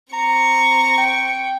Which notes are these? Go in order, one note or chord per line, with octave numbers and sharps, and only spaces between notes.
C4 A#5 C#6
G5